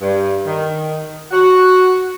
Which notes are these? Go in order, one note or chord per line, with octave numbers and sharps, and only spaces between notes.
G2
D#3
F#4